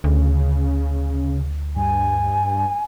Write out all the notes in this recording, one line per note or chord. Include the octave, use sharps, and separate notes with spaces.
D2 C#3
G2 G#5